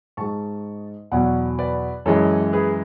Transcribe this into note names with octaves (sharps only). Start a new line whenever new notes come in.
G#2 G#3 A5 C#6
E2 B2 F#3 D5 F#5
B4 D5
F#2 E3 G#3 A4 C#5
G#4 B4